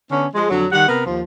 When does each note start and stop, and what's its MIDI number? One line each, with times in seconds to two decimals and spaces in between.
0.11 0.27 50
0.11 0.27 59
0.11 0.27 61
0.34 0.49 53
0.34 0.49 56
0.50 0.65 41
0.50 0.65 50
0.50 0.65 54
0.72 0.88 51
0.72 0.88 55
0.72 0.88 78
0.89 1.06 48
0.89 1.06 59
0.89 1.06 70
1.06 1.22 39
1.06 1.22 53